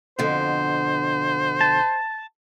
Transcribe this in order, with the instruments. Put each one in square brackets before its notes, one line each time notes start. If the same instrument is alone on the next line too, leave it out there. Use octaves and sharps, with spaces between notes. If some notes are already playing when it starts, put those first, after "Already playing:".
[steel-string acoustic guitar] F2 B2 D3 [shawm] C5
[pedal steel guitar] A5